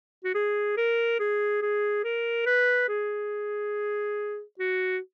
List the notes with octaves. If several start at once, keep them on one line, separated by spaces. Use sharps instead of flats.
F#4
G#4
A#4
G#4
G#4
A#4
B4
G#4
F#4